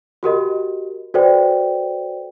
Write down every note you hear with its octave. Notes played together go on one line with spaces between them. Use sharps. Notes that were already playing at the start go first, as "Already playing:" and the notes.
F#4 G4 A#4 D#5
F#4 A4 B4 C5 D5 G5